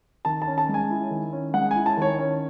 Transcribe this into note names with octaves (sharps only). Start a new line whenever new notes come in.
D#3 A5
A5
C#4
A5
G#3
G#5
E4
D#3
C#4
G#3 F#5
G#5
E4
A5
D#3 C#5
C#4